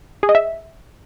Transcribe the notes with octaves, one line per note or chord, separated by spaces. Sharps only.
G#4
D#5
E5